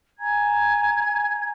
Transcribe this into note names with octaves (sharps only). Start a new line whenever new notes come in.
G#5 A#5 G#6